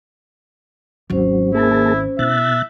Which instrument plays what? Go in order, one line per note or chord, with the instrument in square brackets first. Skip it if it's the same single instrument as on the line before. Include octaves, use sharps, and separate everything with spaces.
[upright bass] G#1 D#2 [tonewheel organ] F#3 [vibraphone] C#4 C5
[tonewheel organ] A#3 G#4 A5 [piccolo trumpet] E4
[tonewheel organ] B2 F#6 A6 [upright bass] E4 [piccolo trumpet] E5